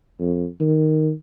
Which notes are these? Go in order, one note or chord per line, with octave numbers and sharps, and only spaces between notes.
F2
D#3